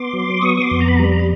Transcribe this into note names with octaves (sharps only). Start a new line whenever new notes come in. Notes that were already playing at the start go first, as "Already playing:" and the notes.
Already playing: B3 C6 D6
F#3
B3 C#6 D#6
D#6
C6 D6
F2
A#5
B5
A#5
G3 B5
A#5
B5